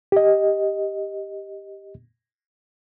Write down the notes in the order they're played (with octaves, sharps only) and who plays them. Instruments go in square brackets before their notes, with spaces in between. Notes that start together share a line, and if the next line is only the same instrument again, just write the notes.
[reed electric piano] G4 D#5